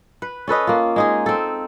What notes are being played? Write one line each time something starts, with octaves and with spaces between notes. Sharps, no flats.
B4
C#4 A4 B4 D#5
A#3 F4
G#3 D#4 G#4
C4 A4